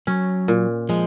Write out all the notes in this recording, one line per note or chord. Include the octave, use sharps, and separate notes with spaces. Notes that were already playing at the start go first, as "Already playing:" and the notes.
F#3 C#4
A#2
F3 G#3